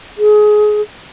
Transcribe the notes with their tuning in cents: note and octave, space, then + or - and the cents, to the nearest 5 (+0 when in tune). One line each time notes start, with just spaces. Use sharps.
G#4 +25